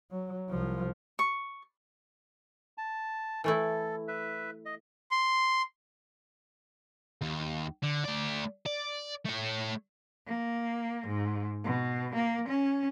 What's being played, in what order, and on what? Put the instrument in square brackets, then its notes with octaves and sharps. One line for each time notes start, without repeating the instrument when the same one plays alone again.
[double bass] F#3
C2 F3
[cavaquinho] C#6
[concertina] A5
[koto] E3 A3 E4 [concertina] A4
[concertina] B4 E5
D#5
[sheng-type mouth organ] C6
[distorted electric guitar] D#2
D3
A3 D5
D5
A3 C#5
[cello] A#3
G#2
B2
A#3
C#4